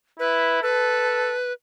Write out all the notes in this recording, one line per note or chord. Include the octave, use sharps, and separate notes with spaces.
E4 B4
A4 B4